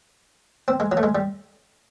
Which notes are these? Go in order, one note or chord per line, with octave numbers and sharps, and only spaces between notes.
C4
G#3
F#3
A3
G#3
G3